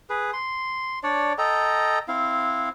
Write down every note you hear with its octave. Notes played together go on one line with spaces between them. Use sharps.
G#4 B4
C6
D4 C#5 D5
A4 D#5 G5 A#5
C4 E4 F5